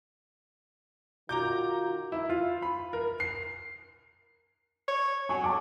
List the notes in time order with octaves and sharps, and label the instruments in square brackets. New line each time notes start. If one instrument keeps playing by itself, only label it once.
[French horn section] D#3 F4 F#4 [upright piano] A#5 D6 G6
[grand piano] E4
F4
B5
A#4
C7
[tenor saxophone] C#5
[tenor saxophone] F#3 [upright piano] G#5 C#6
[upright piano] A5 D6